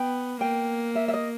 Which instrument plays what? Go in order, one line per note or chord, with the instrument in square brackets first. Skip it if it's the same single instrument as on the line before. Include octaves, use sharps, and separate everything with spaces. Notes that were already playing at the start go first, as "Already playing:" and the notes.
Already playing: [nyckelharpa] B3 [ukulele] G5
[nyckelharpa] A#3 [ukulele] G5
[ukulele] E5
E5
D#5